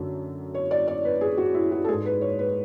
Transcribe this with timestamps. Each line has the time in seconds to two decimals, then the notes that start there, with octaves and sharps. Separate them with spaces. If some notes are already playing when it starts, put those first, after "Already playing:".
Already playing: F#2 D3 A3
0.55 C#5
0.71 D5
0.87 D5
1.05 B4
1.21 G#4
1.37 F#4
1.54 E4
1.72 F#4
1.84 A4
1.88 G#2 G#3 G#4
2.06 B4
2.21 C#5
2.39 B4